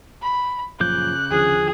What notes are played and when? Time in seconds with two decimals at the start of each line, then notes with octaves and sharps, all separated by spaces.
0.22 B5
0.80 F#2 A#2 C#3 F3 D6 F#6 G6
1.31 D#2 D3 F3 G#4